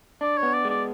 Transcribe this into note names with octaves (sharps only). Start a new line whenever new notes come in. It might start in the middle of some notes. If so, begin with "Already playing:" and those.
D4 D5
C#5
B3
D5
G#3
D5